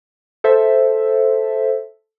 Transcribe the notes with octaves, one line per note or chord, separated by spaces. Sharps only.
A4 C5 E5